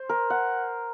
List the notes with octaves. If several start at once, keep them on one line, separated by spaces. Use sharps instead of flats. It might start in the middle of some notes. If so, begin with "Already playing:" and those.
Already playing: C5
A#4
F#5